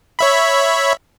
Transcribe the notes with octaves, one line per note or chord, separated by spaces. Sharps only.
C#5 E5 B5